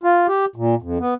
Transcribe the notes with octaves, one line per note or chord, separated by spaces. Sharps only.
F4
G4
A#2
F2
B3